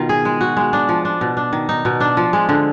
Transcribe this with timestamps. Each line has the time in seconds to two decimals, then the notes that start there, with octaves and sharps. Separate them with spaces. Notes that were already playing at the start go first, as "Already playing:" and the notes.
Already playing: B2 D#3 F4
0.09 G#4
0.25 G#3
0.41 F#4
0.57 G#3
0.73 D4
0.89 F3
1.05 D4
1.21 B2
1.37 D4
1.53 D#3
1.69 D#4
1.85 B2
2.00 D4
2.17 F3
2.33 G#3
2.49 D3